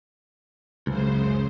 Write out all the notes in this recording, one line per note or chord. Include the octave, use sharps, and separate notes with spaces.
C#2 F#2 C#3 C5